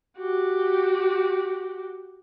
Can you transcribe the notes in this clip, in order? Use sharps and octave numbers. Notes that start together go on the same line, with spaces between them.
F#4 G4